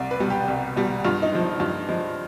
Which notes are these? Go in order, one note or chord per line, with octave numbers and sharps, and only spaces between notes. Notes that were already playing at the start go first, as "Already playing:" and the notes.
Already playing: C2 D5
B4
B2 G3
G4
C2
B2 G3
G2 F4
D#4
F3 G#3
D#4
G2 F4
F3 G#3